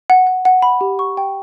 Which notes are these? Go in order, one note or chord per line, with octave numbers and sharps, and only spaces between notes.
F#5
F#5
F#5
B5
G4
C#6
G5